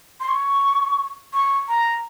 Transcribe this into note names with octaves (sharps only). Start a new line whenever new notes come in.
C6
C#6
C#6
A#5